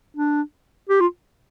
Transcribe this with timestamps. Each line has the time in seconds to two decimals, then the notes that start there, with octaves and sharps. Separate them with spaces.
0.17 D4
0.89 G4
1.00 F4